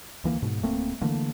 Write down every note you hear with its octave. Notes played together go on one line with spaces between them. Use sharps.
D2 E3 A#3
G#2 B2
D1 A3 A#3 C4
D3 E3 A3 A#3